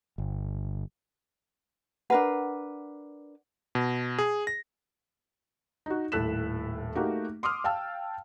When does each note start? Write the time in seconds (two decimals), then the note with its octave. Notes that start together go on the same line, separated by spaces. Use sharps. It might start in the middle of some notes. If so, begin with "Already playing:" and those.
0.18 G1
2.10 D4 A#4 B4 F#5
3.75 B2
4.18 G#4
4.47 A#6
5.86 D#4 F#4
6.12 D#1 A2 A4 F#6 B6 E7
6.95 A3 A#3 D#4 F#4 G4
7.43 C6 D6 D#6 F6
7.64 F5 G5 A5 E6